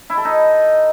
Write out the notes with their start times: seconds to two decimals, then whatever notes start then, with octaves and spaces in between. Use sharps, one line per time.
0.10 E4
0.17 A4
0.25 D#4